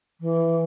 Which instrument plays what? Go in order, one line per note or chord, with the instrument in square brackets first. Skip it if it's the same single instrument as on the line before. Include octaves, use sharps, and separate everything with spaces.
[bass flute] E3